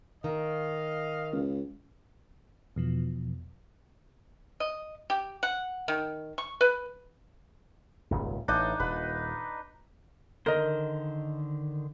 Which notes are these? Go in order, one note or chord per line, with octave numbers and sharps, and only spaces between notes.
D#3 D#5 F5
C#2
E2 B2 F3
D#5
G4
F#5
D#3
C#6
B4
D#1 G#1 C#2
A1 D4 D#4 D#5
D#1 B4
D3 D#3 A#4 C5 D#5